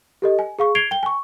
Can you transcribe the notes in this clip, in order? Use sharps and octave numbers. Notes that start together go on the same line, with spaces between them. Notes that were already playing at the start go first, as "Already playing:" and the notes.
G4 A4 D#5
G#5
G#4 F5 C#6
G#6 C7 D7 F7 G7
G5 G7
G#5 C#6